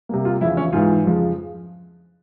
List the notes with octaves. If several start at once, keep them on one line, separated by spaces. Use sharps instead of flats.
C3 G3 A#3
F4
E2 C#3 F3 E4
C#4
G#2 E3 G#3 F4
F2 C#3 F3 G#3